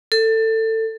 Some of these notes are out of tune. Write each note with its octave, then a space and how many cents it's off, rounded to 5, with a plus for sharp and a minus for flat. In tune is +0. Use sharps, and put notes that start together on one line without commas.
A4 +20